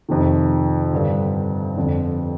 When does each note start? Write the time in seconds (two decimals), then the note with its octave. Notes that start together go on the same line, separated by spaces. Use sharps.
0.09 F2 C3 D#3
0.93 G2 D3
1.77 F2 D3